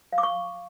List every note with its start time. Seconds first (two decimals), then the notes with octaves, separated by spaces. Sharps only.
0.13 F5
0.18 D6
0.23 C#6